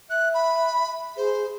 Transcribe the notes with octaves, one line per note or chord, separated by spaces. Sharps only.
E5 F#6
B5
G#4 C5